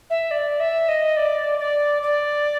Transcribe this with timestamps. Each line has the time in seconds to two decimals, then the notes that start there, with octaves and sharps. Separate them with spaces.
0.10 E5
0.31 D5
0.60 E5
0.89 D#5
1.17 D5
1.59 D5
2.02 D5